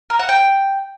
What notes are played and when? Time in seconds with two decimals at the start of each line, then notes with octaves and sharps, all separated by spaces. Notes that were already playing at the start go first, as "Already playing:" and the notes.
0.10 A#4
0.19 F#5
0.29 G5